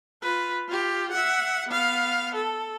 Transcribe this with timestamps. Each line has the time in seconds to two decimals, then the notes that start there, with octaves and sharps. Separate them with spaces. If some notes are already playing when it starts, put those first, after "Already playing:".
0.22 F4 B4
0.67 F4 G4
1.12 E5 F#5
1.69 B3 F5
2.34 A4